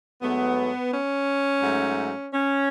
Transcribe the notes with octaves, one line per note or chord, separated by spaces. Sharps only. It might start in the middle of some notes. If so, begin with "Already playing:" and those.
G#2 F#3 A3 B3
C#4
G#2 F#3 A3
C#4